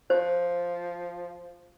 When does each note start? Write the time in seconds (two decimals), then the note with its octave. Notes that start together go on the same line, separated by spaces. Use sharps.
0.10 F3 C5